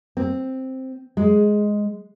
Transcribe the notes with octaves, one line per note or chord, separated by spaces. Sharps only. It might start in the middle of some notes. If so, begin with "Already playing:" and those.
C4
G#3